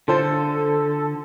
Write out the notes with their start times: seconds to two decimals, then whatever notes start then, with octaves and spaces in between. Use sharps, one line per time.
0.08 D3 F4 A4 C5